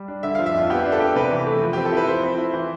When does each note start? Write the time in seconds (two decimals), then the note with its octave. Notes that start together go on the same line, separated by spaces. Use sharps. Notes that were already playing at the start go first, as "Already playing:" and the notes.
Already playing: G3
0.08 D4
0.23 D3 E5
0.35 F3 F5
0.46 E5
0.54 F2 F4
0.70 B3 G4
0.85 D4
0.92 A4
1.00 G4
1.15 C3 B4
1.31 E3
1.47 A3
1.62 F3
1.73 C4 G4
1.85 A4
1.92 E4 B4
2.07 F3 C5
2.23 C4
2.38 E4
2.54 E3